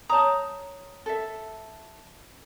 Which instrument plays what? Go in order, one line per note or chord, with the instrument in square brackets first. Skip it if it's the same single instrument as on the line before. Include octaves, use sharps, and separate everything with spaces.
[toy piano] C#5 D#6 [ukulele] A5 A#5
[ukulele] A4 E5